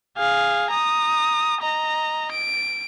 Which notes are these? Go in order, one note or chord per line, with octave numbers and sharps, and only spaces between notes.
G#4 F5
A#5 D#6
D#5 A#5
D7